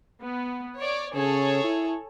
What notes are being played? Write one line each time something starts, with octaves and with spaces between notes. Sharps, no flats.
B3
C#5 D5
C#3 G#4 A4 C#5
E4